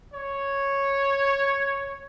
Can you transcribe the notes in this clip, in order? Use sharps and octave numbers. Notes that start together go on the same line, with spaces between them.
C#5